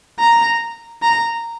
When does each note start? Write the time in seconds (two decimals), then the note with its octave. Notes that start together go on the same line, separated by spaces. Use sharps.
0.20 A#5
1.03 A#5